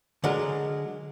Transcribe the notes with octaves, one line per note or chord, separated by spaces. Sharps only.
D3 F#3 G#3 A#4